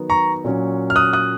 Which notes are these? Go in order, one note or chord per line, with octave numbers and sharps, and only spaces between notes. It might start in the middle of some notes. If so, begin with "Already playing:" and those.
Already playing: D#3 F#3 B3 D#4
A#5 C#6
A#2 F#3 C#4
F6
D#6 F#6
D#6 F#6